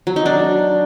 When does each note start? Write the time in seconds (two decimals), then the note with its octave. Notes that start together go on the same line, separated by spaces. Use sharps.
0.07 F#3
0.16 D#4
0.26 D4